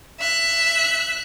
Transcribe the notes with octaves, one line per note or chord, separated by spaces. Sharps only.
E5 F#6